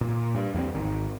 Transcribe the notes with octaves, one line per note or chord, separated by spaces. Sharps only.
A#2
G2
E2 G2 B3 C4
G#1 D#3